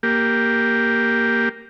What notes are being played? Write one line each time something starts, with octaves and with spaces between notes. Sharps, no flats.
A#3 G4